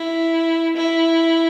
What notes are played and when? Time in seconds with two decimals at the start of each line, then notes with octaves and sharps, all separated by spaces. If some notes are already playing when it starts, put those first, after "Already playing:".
Already playing: E4
0.76 E4